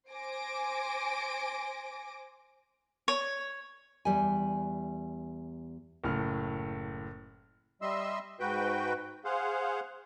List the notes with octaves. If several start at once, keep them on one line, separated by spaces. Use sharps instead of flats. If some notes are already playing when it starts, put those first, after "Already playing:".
C5 G#5 D6 A#6 D7
C#5
E2 G3 G#5
F#1 A2 F6
G3 D#5 E5 C6 E6
G#2 F#4 B4 G5 G6
G#4 C5 F5 F#5